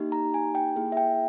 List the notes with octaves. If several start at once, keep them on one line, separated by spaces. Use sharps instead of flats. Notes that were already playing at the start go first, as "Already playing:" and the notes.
Already playing: A#3 D#4 G4
A#5
G#5
G5
A#3 E4 G#4
E5
G5